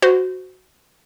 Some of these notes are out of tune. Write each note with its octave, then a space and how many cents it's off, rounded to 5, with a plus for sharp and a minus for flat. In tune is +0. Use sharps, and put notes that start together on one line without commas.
F#4 +0 C5 -25